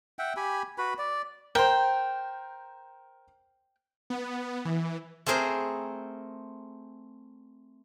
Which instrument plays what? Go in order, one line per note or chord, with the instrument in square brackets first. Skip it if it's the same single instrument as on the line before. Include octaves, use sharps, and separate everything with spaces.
[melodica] E5 F#5 G5
G4 G#5 B5
F#4 B4 B5
D5
[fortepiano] A#4 C5 [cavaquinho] G5
[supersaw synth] B3
E3
[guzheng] A3 C4 G#4 A#4 C5